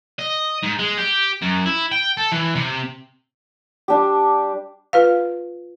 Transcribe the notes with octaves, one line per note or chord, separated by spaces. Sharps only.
D#5
G#2
G#3
G4
F#2
E4
G5
A4
E3
C3
G3 D4 G4
F4 B4 F5